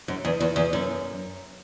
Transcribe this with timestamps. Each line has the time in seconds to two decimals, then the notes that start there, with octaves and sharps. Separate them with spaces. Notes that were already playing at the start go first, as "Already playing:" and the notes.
0.08 F#2
0.25 E2
0.40 E2
0.56 E2
0.73 F#2